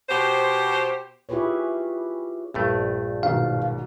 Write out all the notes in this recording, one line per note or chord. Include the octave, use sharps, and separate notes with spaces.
B2 G4 C5
E4 F4 G4 G#4 B4 C#5
A#1 G2 A3
G#2 B2 D#3 F5